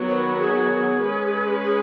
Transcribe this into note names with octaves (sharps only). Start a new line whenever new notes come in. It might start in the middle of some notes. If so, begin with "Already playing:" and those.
Already playing: D#3 F#3 B3 F#4
C#5
B4
G#4
G#3 C#4 B4
G#4